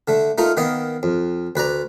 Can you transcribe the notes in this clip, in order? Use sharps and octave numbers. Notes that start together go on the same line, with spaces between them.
D3 A3
A3 D#4 F4 A#4
D#3 A#3 B3 D#5
F2
D2 B4 D5 A#5